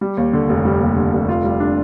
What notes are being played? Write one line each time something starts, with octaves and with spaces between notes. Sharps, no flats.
G3
D#2
D3
F1
G3
D#2
D3
F1
F4
G3
D4